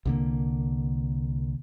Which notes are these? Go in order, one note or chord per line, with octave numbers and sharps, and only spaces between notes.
C2 D3 A#3